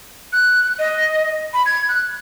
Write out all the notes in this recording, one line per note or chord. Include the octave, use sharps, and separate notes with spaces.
F#6
D#5
B5
G#6
F#6